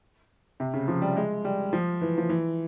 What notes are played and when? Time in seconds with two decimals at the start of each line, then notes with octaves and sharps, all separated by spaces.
0.60 C3
0.74 C#3
0.88 F3
1.02 G3
1.17 G#3
1.45 G3
1.73 F3
2.01 E3
2.18 F3
2.30 E3